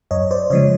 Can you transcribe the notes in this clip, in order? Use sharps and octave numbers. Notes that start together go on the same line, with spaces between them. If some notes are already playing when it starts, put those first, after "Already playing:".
F#2 C#5 D#5
C5 D5
C#3 F3 G#3 C#5 D#5